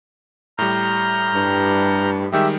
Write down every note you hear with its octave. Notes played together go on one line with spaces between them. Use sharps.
A2 G3 A#5 F6 G6
G2
D#3 G3 G#3 G4 E5